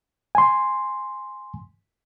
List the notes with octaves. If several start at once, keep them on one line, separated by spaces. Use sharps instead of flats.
G#5 C6